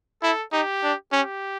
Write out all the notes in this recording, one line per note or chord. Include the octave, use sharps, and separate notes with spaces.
E4 A4
D#4 G4
D4
C#4 G4